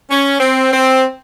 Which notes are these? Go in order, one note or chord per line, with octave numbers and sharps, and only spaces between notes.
C#4
C4
C4